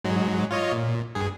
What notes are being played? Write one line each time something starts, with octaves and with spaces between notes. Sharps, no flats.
G#2 F#3 G#3
F4 C#5 D#5
A#2
G2 G#4